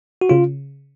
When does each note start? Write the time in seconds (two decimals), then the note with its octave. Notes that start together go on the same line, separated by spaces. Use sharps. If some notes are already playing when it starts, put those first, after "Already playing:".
0.21 F#4
0.29 C#3 F4